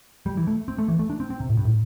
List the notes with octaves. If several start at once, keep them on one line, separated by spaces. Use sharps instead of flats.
G3
E3
A3
C4
A3
E3
A3
D4
C4
C4
C3
A2
G2
A2